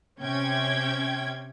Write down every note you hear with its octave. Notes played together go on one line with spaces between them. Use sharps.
C3 C#4 G5 G#6